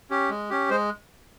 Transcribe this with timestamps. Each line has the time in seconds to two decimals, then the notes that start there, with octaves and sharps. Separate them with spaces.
0.10 C#4 G4
0.30 G#3
0.50 C#4 G4
0.70 G#3 C5